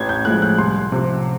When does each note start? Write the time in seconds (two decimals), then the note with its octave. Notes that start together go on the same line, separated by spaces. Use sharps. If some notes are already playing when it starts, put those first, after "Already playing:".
Already playing: A1 G#6
0.09 G6
0.25 A2 F3 G#3 F#6
0.42 F#6
0.58 C2 C6
0.92 C3 F3